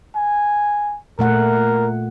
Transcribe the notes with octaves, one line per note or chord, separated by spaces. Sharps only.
G#5
A#2 A3 A#4 F#5